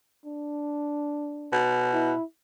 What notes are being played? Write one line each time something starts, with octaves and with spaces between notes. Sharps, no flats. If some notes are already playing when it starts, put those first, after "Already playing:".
D4
B2
E4